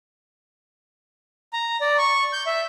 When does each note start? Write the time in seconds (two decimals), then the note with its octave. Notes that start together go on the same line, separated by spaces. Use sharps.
1.53 A#5
1.81 D5
1.98 C#6
2.33 G6
2.47 E5